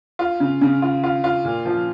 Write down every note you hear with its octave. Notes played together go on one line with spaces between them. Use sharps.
F4
C#3
C#3
F4
F4
F4
A#2
F3